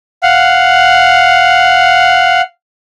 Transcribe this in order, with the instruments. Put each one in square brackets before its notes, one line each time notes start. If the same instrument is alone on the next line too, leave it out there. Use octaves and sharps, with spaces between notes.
[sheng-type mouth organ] F5 F#5